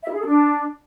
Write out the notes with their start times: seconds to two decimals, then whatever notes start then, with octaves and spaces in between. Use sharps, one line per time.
0.02 E5
0.08 E4
0.14 G#4
0.20 A4
0.25 D4